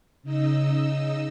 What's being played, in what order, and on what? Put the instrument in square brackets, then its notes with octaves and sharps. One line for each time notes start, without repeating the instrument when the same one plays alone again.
[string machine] C#3 D#4 D#5 E6